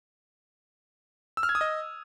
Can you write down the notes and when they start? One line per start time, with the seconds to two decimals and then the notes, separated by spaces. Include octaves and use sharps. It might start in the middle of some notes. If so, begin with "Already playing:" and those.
1.37 E6
1.43 F6
1.49 G#6
1.55 D#6
1.61 D#5